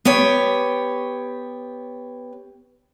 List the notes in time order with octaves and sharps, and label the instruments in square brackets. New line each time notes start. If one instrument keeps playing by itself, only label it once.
[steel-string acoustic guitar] B3 G4 C#5